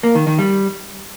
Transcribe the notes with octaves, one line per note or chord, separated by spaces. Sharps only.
A#3
D#3
D#3
G3